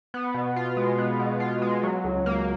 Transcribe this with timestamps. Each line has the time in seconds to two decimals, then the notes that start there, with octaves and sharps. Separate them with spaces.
0.14 B3
0.34 B2
0.56 F4
0.77 G#3
0.98 B3
1.19 B2
1.40 F4
1.62 G#3
1.83 F#3
2.04 C#2
2.26 A#3